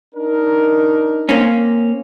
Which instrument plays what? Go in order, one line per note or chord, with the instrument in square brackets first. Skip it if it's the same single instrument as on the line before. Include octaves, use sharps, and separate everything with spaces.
[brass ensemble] D4 D#4 A#4
[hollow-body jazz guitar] A#3 C4 C#4